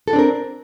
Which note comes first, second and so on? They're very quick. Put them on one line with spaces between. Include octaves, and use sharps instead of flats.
A4 F#4 D4 C4 A#4